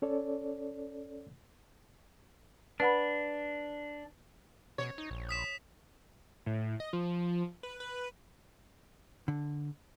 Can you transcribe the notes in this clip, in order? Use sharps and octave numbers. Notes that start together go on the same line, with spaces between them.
C#4 A4 C#5 D5
D4 B4 F#5 B5
B2 C#5
D#4
A#1
D#6 B6 E7
A2
D#5
F3
B4
B4
D3